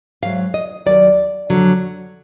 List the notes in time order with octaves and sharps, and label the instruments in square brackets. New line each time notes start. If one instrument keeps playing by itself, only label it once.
[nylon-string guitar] G#2 F#3 F5
D#5
D#2 D#3 F#3 D5
F2 D3 F#3